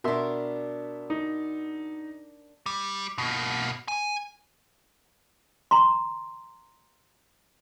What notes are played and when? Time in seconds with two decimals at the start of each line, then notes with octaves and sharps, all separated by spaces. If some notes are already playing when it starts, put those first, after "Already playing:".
0.04 B2 D4 A#4 E5 C6
1.10 D#4
2.66 G3
3.18 B2 A#3
3.88 G#5
5.71 A#5 C6